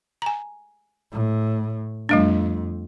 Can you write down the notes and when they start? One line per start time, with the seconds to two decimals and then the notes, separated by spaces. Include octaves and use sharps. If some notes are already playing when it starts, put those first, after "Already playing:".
0.22 G#5 A#5
1.12 A2
2.09 F2 G3 A3 D4